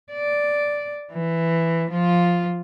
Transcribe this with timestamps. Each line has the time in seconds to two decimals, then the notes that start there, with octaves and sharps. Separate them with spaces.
0.12 D5
1.12 E3
1.90 F3 F4